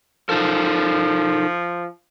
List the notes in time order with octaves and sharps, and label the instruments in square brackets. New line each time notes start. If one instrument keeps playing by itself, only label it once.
[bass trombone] F3 [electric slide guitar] D#4 A4 A#4